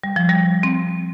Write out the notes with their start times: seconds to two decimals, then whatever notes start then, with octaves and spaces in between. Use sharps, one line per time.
0.04 G3
0.16 F3
0.29 G3
0.63 C4